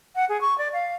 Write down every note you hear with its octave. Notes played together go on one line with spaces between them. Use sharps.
F#5
G#4
C#6
D5
F5